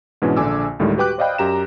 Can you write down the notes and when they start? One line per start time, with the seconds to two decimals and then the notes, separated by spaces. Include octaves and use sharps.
0.22 G#2 B2 E3 C#4 D4
0.36 A#1 D3 G#5 D6 E6
0.79 D2 A2 D#3 G3 G#3
0.97 F#4 G4 B4 G5 D6 F#6
1.18 C5 D5 D#5 F5 G5 B5
1.38 F#2 G4 A#5 E7